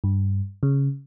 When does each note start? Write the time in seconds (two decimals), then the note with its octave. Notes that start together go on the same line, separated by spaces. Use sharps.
0.04 G2
0.63 C#3